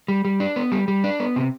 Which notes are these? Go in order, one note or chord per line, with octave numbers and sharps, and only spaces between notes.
G3
G3
D4
B3
G3
G3
D4
B3
C3